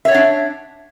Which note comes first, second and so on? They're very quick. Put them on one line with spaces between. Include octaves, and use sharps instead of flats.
E5 C#5 F#5 D4